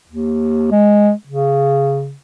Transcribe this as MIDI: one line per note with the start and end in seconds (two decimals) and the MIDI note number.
0.08 0.69 39
0.71 1.12 56
1.27 2.14 49